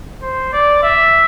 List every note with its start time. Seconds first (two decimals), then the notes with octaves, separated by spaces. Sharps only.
0.22 C5
0.53 D5
0.83 E5